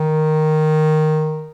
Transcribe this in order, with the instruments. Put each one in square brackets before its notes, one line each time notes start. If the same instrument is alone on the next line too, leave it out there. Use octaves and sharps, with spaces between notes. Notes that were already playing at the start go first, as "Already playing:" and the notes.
Already playing: [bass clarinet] D#3